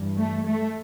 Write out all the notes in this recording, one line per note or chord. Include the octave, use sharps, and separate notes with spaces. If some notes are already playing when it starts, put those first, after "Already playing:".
Already playing: G2 E3
A3
A3